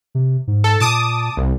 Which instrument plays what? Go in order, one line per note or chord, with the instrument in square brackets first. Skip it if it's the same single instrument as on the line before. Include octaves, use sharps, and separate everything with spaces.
[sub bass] C3
G#2
[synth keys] A4
[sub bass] A#2 [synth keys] A5 D6 D#6
[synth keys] C2